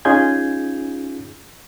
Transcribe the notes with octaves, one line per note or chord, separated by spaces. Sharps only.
C#4 D#4 F4 G#4 G6 G#6